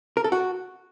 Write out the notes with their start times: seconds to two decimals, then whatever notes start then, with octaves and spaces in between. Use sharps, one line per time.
0.17 A#4
0.24 A4
0.32 F#4